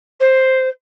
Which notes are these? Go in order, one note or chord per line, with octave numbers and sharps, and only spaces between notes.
C5